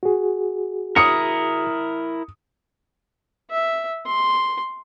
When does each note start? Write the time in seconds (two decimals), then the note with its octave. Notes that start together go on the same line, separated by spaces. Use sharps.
0.03 F#4 G#4
0.96 E4 A#4 D#6 C#7
3.50 E5
4.06 C6